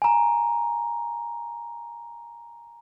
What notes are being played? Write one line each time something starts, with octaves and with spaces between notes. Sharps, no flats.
G#5 A#5